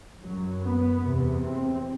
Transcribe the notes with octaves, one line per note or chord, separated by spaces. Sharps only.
F#2 F#3
B3
E2 C3
C4